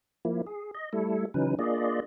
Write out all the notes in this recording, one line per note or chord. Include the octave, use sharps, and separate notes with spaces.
F3 A#3 E4
G#4
D#5
G3 A3 E4 A4
C#3 E3 F#3 C#4 D#4 B4
A#3 D4 F4 G#4 D5 D#5